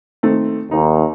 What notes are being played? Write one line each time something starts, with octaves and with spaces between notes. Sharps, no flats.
D#3 A3 C4
D#2 D#4